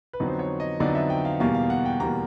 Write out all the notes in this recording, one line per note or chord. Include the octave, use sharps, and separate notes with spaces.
B4
F2 D3 F#3 B3 D#4
C5
C#5
D#5
F2 D3 F#3 B3 D#4 D5
E5
G5
F5
E2 B2 G3 A#3 F5
F5
F#5
G5
E2 B2 G3 A#3 A#5